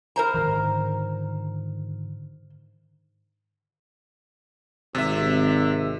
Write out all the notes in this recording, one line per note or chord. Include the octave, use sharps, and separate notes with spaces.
A#4 C5 A#5
G#2 D3 D#3
G#1 C3 E5